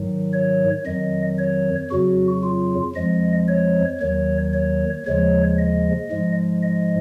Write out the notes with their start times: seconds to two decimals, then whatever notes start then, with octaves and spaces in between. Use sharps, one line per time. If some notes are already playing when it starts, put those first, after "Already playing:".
Already playing: G#2 D#3 F#3
0.33 C#5
0.86 F2 D#3 F#3 D#5
1.38 C#5
1.90 F2 C#3 F#3 F#4
2.43 F4
2.95 F2 F3 G#3 D#5
3.48 C#5
4.01 D#2 D#3 F#3 C#5
4.53 C#5
5.06 D#2 C#3 F3 G#3 C#5
5.58 D#5
6.11 G#2 F3 G#3
6.63 D#5